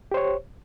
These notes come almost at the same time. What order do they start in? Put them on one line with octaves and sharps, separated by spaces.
G4 C5 C#5